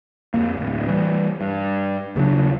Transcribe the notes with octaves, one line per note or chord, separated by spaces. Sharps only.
F2 A#3
D1 D#2
E3 G3
G2
D#2 C#3 F#3 D4